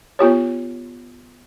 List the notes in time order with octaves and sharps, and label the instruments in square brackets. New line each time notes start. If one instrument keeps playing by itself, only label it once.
[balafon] B3 F4 G4 C#5